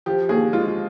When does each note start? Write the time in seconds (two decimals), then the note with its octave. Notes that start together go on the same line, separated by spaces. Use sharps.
0.06 F3 G4
0.29 D#2 G#4
0.53 G#3 F4